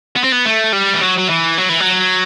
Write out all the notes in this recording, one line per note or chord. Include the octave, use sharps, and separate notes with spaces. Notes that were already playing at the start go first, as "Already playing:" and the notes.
B3
C4
B3
A3
G3
E3
F#3
F#3
E3
F#3
E3
F#3